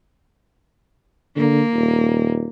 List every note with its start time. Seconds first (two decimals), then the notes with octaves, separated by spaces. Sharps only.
1.36 D3 A#3
1.73 D#1